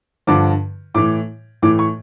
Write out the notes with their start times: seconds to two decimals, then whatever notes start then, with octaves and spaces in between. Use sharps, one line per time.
0.27 G2 D3 F3 D6
0.95 A2 E3 D6
1.62 A2 E3 D6
1.79 C#6